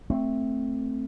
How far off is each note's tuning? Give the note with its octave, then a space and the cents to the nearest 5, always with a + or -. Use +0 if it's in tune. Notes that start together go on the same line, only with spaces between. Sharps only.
A3 +0 C4 +0